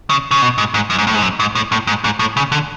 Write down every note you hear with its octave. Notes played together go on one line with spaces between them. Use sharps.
C#3
C#3
B2
G#2
G#2
F#2
G#2
A2
G#2
F#2
G#2
A2
A2
G#2
G#2
A2
C#3
D3